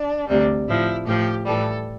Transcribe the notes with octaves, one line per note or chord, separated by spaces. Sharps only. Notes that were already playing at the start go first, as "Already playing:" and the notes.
Already playing: D4
D2 C3 G3
A2 F3 E4
A2 F3 G4
A2 E3 G3 A4